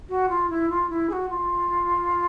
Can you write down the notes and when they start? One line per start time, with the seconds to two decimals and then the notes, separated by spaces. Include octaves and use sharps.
0.09 F#4
0.29 F4
0.49 E4
0.69 F4
0.89 E4
1.09 G#4
1.12 F#4
1.29 F4